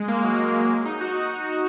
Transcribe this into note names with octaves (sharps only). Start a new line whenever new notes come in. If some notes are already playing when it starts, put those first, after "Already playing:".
Already playing: G#3
A#3
F#3
G#3
D#4
F#4